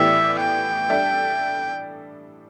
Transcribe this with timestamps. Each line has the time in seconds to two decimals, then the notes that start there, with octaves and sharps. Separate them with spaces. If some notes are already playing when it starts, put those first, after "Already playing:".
Already playing: A2 E3 B3 G4 D5 E5
0.40 G5
0.89 G3 D4 A4 E5